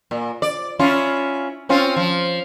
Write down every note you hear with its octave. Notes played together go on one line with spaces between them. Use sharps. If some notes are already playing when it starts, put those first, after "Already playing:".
A#2
D5
C#4 E4 F4
C4 C#4 F4
F3